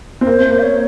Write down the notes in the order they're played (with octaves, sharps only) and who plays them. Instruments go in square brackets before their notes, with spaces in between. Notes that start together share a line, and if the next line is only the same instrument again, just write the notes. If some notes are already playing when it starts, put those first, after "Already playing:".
[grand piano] C4
[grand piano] A#3 [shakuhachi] C5
[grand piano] A#3
[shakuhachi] F5
C#5